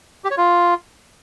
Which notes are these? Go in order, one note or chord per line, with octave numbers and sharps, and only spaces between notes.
G4
C#5
F4